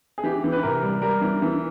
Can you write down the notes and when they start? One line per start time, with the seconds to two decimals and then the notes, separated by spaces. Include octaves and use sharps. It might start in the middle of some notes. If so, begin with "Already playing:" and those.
0.18 G#4
0.24 E3 G4
0.44 E3
0.52 B4
0.63 C3 A#4
0.83 G3
1.02 G3 A#4
1.21 E3
1.42 E3